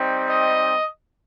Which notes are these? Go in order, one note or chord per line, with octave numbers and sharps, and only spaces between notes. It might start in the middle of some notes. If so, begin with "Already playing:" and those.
Already playing: G3 C4 D#4
D#5